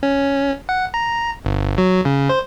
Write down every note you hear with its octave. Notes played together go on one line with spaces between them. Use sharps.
C#4
F#5
A#5
G1
F#3
C#3
C5